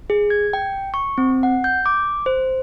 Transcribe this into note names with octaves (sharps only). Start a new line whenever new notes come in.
G#4
G#6
G5
C#6
C4
F#5
G6
D6
C5